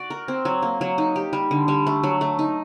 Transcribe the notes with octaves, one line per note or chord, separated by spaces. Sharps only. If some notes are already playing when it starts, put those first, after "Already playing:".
Already playing: F#4 D5
A#4
C4
F#3
A#3
F#3
D#4
G4
G3
D3
G3
A3
F#3
A3
D#4